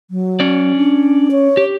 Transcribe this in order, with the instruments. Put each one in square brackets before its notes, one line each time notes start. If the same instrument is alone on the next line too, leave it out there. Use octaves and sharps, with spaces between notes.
[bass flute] F#3
[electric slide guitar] C#4 D5
[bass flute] D4
C#5
[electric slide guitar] G4